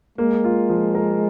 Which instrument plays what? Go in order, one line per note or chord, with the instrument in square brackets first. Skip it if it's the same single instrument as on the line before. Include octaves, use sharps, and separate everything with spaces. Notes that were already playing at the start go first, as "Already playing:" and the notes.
[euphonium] G#3 [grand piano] A#3
[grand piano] F4
F3
A#4